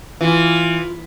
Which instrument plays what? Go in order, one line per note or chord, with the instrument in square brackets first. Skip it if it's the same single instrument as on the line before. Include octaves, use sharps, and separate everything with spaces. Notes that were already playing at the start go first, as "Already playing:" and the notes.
[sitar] E3 [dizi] F4